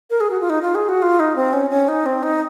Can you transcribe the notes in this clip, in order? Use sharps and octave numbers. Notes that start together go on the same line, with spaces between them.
A#4
G#4
F#4
F4
D#4
F4
G#4
F#4
F4
D#4
C4
C#4
C#4
D#4
C4
D#4